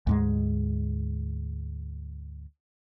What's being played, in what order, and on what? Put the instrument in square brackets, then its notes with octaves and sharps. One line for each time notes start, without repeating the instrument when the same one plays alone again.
[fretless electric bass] D2 G#2 G#3